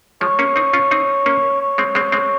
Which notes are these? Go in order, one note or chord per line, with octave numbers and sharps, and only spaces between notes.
F3 G#3 C#5
A#3 C#4
C4 D#4
C#4 F4
C4 D#4
A#3 C#4
C#5
G#3 C4
G#3 C4
G#3 C4